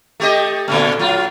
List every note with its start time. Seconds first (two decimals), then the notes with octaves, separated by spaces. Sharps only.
0.20 A3 G4 D#5
0.68 A#2 D3 A3
0.99 F#3 F4